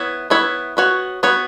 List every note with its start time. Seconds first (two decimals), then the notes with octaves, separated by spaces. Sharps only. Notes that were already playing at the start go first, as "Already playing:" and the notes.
Already playing: B3 E4 C#5
0.30 B3 E4 C#5
0.77 B3 F#4 C#5
1.23 B3 F#4 C#5